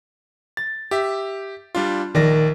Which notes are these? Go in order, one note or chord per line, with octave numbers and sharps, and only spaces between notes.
A6
G4 E5
G3 D4 F4
A#1 D#3 D5 A#6